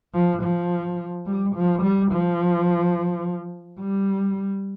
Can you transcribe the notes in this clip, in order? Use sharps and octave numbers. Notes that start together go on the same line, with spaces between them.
F3
F3
G3
F3
G3
F3
G3